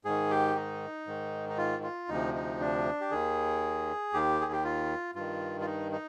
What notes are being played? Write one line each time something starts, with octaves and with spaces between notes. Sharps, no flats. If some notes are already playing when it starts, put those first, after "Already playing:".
G#2 D#3 G#4
G4
D#4
G#2 D#3
D#4
F4
F4
D2 C3 F3 D#4
D#4
D4
G4
D#2 D#3 G#4
D#2 D#3 G4
G#4
G4
F4
G2 D#3 F4
F4
D#4
D#4